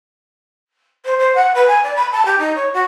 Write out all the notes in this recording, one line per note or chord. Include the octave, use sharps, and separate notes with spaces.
C5
C5
F#5
B4
G#5
D5
B5
A5
G4
D#4
C#5
F#4